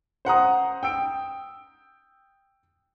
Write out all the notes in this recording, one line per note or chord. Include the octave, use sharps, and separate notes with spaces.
C5 F#5 A#5 D#6
G5 E6 D7